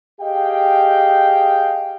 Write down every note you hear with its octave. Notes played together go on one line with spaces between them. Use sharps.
G4 G#4 D#5 F5 G5